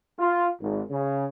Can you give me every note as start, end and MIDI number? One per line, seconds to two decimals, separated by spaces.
0.18 0.46 65
0.60 0.81 32
0.89 1.25 49